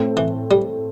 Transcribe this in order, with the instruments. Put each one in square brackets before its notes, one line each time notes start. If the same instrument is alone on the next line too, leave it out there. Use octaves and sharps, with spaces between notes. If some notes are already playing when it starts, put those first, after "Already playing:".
Already playing: [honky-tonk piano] A2 A3 C4
[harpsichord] E3
G3